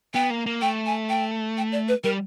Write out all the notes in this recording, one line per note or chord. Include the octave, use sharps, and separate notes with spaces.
B3 G5
A#3
A#3
A3 G5
G#5
G5
G5
D5
B4
G3 A#4